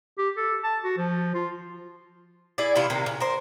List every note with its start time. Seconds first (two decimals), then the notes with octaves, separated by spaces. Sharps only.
0.18 G4
0.37 A4
0.64 A5
0.84 F#4
0.98 F3
1.34 F4
2.58 E4 G#4 D5
2.75 C3 E3 E4 F4
2.90 C3 D#3 A#3
3.06 C#3
3.20 A#4 C5